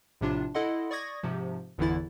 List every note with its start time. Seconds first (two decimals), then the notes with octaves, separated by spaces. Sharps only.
0.21 A#1 A2 C3 D4 F4
0.54 E4 A4 D#5 F#5 C6
0.91 D5 C#6 D#6 G#6 A#6
1.23 G#2 C3 F3
1.78 G1 E2 D3 E3 E4 A6